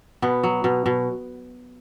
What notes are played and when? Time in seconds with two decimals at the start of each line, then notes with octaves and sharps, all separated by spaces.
0.22 B2 B3
0.43 F#3
0.64 B2
0.86 B2